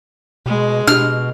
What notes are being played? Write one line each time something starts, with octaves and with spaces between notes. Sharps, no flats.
B2 G#3
B2 D4 G4 F6